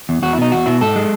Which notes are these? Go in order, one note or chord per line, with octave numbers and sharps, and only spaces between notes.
E2
E2 F#4
E4
B2 D#4
E2 F#4
B2 E4
G#2 A4
G#3